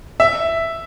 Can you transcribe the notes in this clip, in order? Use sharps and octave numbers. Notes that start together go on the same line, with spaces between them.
E5